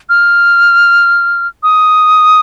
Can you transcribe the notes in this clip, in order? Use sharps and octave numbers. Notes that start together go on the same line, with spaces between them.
F6
D#6